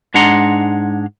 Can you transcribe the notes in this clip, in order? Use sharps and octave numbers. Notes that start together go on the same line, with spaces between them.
G#2 G#3 D4 F#5 A#5 C6